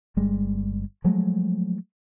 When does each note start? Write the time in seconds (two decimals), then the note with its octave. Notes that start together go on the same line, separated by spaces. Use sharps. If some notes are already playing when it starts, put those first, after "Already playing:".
0.17 G1 G3 G#3
1.04 F3 F#3 G#3 A3